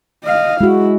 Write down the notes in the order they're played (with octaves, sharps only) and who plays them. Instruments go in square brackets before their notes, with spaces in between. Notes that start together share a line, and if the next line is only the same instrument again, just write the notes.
[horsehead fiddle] D#5 F5
[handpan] G#3 F#4 [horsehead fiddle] E4